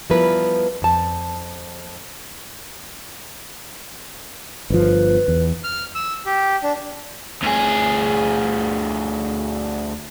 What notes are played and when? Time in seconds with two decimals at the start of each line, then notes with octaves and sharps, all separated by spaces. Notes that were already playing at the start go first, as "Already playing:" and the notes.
0.10 F3 G3 B3 E4 A#4 B4
0.82 F2 A5
4.70 G1 F3 B4
5.28 E2
5.64 F6
5.95 E6
6.26 G4
6.63 D4
7.43 D2 G#4